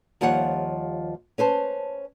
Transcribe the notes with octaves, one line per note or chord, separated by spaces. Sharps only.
D#2 D#3 F3 G3 C#5 F#5
C#4 B4 C5 A5